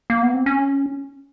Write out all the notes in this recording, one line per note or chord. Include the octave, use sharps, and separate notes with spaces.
A#3
B3
C4
C#4